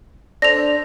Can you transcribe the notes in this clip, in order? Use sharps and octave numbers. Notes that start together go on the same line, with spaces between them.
D4 A4 C5 A#6 F7